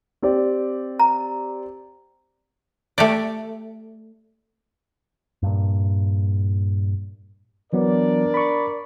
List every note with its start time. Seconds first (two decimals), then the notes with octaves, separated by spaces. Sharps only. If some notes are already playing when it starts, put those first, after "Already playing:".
0.23 C4 G4 D5
1.00 A#5
2.98 A3 G4 D5
5.43 G2 A#2
7.73 E3 F#3 B3 D4 A#4 D5
8.34 B5 C#6